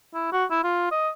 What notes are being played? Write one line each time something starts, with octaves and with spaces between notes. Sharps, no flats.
E4
F#4
E4
F4
D#5